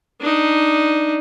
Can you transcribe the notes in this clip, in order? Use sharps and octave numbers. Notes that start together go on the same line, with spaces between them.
D4 D#4